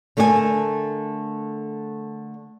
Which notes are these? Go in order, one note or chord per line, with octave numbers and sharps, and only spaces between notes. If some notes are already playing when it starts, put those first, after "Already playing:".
D3 A3 A4 A#4 D5 G#5